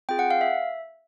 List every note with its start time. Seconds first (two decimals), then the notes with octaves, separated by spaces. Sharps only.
0.09 C4 F4 G#4 G5
0.19 F#5
0.31 F5
0.41 E5